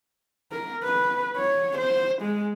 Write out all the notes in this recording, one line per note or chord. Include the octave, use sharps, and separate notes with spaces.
A#4
B4
C#5
C5
G#3